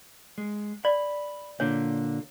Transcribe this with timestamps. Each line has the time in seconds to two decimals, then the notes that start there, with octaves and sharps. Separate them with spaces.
0.38 G#3
0.85 D5 B5
1.60 A#2 D3 A#3 C#5